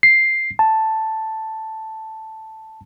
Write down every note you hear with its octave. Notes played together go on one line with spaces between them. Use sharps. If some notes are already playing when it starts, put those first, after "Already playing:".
C7
A5